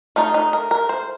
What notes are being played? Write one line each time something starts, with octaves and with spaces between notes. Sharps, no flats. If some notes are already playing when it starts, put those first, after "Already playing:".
A3 D#4 F4
D#4
A#4
A#4
C5